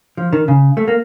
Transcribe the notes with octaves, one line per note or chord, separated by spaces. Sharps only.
F3
D#3
C#3
A3
A#3